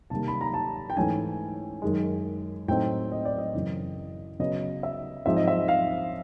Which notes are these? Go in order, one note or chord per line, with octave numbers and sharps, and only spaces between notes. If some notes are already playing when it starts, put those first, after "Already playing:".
C3 D#3 G3 A#3 A5
B5
A#5
A5
G5
G#2 E3 A3 C#4 G#5
F#2 D#3 G#3
A2 F#3 A3 C4 D#4 G5
D#5
D5
D#5
F#2 C#3 E3
C#3 F#3 B3 D#5
E5
G#2 F3 G#3 C4 D#4 E5
D#5
E5
F5